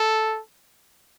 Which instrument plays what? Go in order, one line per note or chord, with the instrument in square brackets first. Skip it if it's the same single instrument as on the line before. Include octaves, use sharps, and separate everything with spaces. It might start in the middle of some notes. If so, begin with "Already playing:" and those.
Already playing: [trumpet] A4